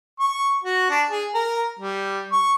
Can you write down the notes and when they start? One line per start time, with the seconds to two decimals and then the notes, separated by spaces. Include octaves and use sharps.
0.20 C#6
0.64 F#4
0.90 D4
1.10 G#4
1.34 A#4
1.80 G3
2.32 C#6